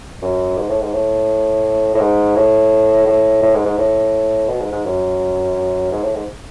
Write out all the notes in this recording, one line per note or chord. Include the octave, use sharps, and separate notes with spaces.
F#2
G#2
A2
G#2
A2
A2
G#2
A2
A2
A2
G#2
G#2
A2
B2
G#2
G#2
F#2
G#2
A2
G#2